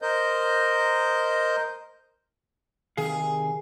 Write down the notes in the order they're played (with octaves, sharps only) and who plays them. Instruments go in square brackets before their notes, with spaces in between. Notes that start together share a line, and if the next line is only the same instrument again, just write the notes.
[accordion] A#4 C5 D#5 G6
[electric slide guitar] C3 D#3 F5 [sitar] G#4